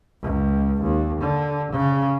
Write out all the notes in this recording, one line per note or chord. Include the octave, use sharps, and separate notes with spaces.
C#2
D#2
D3
C#3